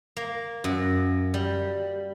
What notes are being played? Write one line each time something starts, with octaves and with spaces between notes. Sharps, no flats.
A#3
F#2
G3